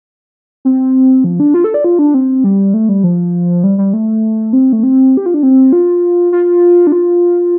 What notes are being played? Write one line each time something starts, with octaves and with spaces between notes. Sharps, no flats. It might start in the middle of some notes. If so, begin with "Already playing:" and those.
C4
F3
D4
F4
A4
D5
F4
D4
C4
G3
A3
G3
F3
G3
G3
A3
C4
A3
C4
G4
F4
D4
C4
F4
F4
D4
F4